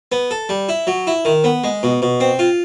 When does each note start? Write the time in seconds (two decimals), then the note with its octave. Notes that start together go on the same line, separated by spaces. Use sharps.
0.12 B3
0.31 A4
0.49 G3
0.69 E4
0.87 F#3
1.07 E4
1.25 D#3
1.44 B3
1.64 G#3
1.83 B2
2.02 B2
2.20 C4
2.39 F4